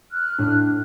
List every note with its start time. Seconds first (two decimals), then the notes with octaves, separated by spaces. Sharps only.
0.11 F6 F#6
0.39 A2 D4